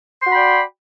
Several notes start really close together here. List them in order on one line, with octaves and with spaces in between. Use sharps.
C6 F#4 B5 G5 D5